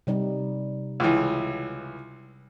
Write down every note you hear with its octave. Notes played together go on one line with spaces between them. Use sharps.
C3 G3 D#4
C#2 E3